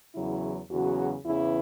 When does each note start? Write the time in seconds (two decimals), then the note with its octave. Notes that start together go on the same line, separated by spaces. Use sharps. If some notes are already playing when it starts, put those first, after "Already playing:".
0.15 E2 C#3 F#3 E4
0.70 E2 C#3 F#3 F#4
1.25 E2 C#3 E3 E4